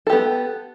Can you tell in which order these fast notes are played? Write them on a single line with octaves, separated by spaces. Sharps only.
A4 G4 B3